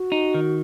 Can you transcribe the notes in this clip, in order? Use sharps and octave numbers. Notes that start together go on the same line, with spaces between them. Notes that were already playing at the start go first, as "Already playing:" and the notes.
Already playing: F#4
D#4
D#3